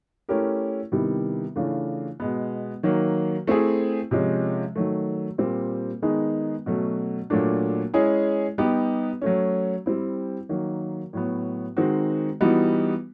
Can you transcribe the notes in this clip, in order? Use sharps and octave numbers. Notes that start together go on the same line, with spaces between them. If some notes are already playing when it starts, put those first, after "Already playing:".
A3 C#4 E4 G4 A#4
C3 D#3 G3 B3 E4
C#3 E3 A3 D4 F4
B2 G#3 B3
D#3 F#3 A#3
A3 C4 E4 G#4
C3 F3 G#3 C#4
D#3 F#3 A3
A#2 G3 C4
D#3 G#3 B3 D#4 G#4
B2 F#3 A3 C#4
A#2 F#3 A3 D4
G#3 C#4 E4 G#4
G3 B3 D#4 G4
F#3 A3 C#4
G3 C4 E4
D#3 F#3 A#3
A2 F#3 B3
D#3 G#3 C4 D#4 F#4
E3 G3 B3 D#4 F#4